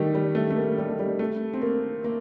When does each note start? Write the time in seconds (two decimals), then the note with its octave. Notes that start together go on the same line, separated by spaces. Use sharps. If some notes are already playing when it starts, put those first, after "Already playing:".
Already playing: D#3 G3 A3
0.15 G3
0.35 A3
0.51 A3
0.56 A#3
0.78 G3
0.89 A3
0.99 G3
1.19 A3
1.53 C4
1.62 A#3
2.04 A#3